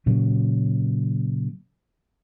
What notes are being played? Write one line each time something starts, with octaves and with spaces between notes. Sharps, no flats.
A#2 C#3 F#3